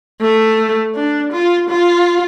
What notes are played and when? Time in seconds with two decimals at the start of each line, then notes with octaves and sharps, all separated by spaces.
0.21 A3
0.95 D4
1.32 F4
1.69 F4